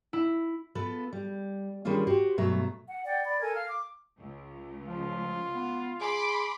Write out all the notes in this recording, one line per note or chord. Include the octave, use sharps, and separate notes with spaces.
E4
B3 F4 A4 B4
G3
D#3 G3 G#3 C#4 D4 F4
F#4 G4 C5
G2 B2 F#3 A3 E5 A#5
F#5
D5 F#5 G5
D5 B5
A4 A#4 G#5 G#6
F5 F6
D6
C#2
F3 F4
B3
G#4 B5 C6 D6